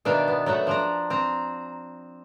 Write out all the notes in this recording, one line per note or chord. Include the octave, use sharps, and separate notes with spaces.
B2 D#3 D4 E5 F5
B3
F#3 A3 E5 F#5
F3 D4 A#5
C4 A#5